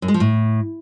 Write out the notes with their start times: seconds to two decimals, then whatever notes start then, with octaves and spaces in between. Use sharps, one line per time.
0.02 F#2
0.08 G#3
0.14 F3
0.20 A2